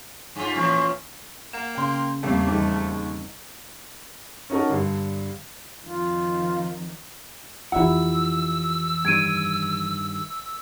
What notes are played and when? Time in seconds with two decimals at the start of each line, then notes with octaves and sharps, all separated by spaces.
0.36 G2 F4
0.55 A2 E3 F3 C#4
1.53 A#3 F#5 E7
1.75 C#3 F5 G5 C6
2.23 E2 A2 C3 G3 A3 A#3 C4
2.48 D#2 G#2 E3 G3 C4 D#4 D6
4.50 C#4 D#4 F#4 A4 A#4
4.69 G2 D3
5.83 F2 D#3 F3 F4
7.72 F2 E3 E4 F4 G4 E5 F#5 E6
9.05 G2 D#3 G#6 D7 D#7